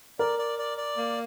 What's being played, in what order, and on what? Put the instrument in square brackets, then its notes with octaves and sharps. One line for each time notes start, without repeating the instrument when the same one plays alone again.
[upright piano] A#4 [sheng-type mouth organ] D5
[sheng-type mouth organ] D5
D5
D5
A#3